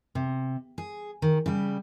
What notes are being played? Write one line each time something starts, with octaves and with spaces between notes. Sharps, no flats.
C3
G#4
D#3
C#3 G3